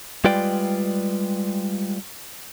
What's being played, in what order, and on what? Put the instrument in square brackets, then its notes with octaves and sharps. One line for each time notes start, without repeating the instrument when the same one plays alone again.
[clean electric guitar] G3 G#3 F4 B4 D5 G5